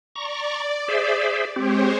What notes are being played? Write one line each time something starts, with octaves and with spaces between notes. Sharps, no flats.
D5 A#5 C#6
G#4 C5 E5
G#3 C4 G4 C5 C#5